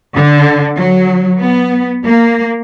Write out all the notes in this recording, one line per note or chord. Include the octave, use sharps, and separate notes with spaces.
D3
F#3
B3
A#3